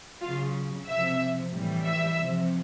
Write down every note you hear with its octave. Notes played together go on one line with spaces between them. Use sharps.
C#3 F#3 F4 F5
C3 F3 E5 E6
A2 E3 G3
E5 E6
C3 F3